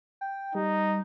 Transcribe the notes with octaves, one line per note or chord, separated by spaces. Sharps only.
G5
G3 D#4